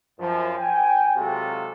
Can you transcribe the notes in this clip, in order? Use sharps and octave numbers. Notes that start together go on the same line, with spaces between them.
F#2 F3
G5 G#5
C3 F#3 G#3 F4 F#4 A4